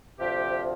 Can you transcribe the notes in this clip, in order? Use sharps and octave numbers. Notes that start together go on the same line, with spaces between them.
D2 C3 F3 G4